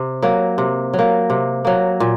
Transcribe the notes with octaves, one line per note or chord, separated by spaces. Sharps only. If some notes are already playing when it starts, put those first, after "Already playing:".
Already playing: C3
F#3 A#3
C3
F#3
A#3
C3
F#3 A#3
A#2